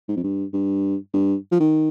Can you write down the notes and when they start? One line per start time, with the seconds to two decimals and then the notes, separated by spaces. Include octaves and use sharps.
0.08 G#2
0.16 F2
0.23 G2
0.53 G2
1.13 G2
1.51 F3
1.60 D#3